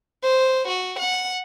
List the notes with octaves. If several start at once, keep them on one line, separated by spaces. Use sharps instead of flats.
C5
F#4
F#5